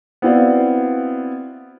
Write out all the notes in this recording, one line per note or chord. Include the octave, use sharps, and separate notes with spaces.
B3 C4 E4 F#4 D5 F5